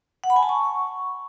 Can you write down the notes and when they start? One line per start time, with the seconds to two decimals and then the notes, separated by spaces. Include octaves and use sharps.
0.24 F#5
0.30 B5
0.36 G#5
0.43 A5
0.49 C#6